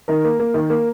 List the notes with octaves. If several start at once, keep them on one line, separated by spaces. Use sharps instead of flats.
D#3 A#4
A#3
A#3
D#3
A#3